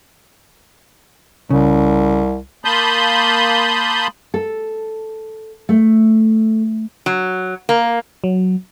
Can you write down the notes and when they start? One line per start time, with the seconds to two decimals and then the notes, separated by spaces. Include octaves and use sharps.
1.50 C2 C#3
2.65 A#3 A5 B5 C6 D#6 G6
4.34 A4
5.69 A3
7.06 F#3
7.69 A#3
8.24 F#3